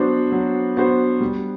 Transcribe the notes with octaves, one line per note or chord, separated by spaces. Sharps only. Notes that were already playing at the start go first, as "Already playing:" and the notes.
Already playing: F#3 B3 D4 F#4 C5
F#3
B3 D4 F#4 C5
G3